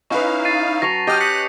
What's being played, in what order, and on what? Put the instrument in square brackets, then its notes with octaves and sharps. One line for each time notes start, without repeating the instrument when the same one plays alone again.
[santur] C#4 B4 [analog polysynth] D#4 E4 F5 [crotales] C#6
[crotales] A6 C7 D#7
[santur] F#3 C#5 A5 [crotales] A#6 F7
[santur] G4 D#5 [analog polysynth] G5 F6 [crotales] D#6 G6 A#6
[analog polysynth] F#6 [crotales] A#6 B6 C#7